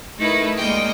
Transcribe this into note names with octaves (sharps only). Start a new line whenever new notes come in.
A3 D#4 E4 A#4 B4
D2 G#3 A#3 D#5 G5